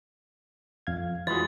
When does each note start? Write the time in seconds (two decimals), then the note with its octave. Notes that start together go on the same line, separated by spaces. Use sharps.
0.87 F2 F5 G#6
1.27 E3 G#3 F4 F#4 A6